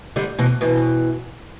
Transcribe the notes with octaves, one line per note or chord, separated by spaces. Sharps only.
D3 G3
B2 E3
B2 E3